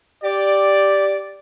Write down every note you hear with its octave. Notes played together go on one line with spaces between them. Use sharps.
G4 D5